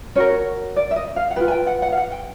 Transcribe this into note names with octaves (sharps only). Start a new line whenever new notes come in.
C#4 F#4 A#4 C#5
D5
E5
D#5
F5
F#5
F4 G#4 B4 G5
G#5
G5
F#5
F#5
F5
F#5
G5